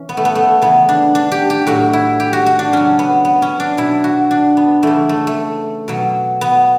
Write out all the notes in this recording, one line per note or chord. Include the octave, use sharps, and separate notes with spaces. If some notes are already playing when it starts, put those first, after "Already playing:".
Already playing: E3 C#4
B3
A3
B3
A3
C#3 E3 B3
D4
D4
G4
G4
A2 F#3 F#4
E4
G4
F#4
F#4
D4
C#3 F#3 C#4
B3
B3
C#4
D4
B2 F#3 E4
F#4
D4
B3
C#3 E3 A3
A3
A3
B2 F#3
B3